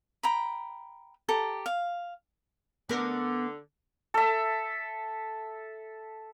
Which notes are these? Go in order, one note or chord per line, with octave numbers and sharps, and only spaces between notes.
G5 A#5 B5
G4 A4 A#5
F5
D3 B3 A#4
A4 E5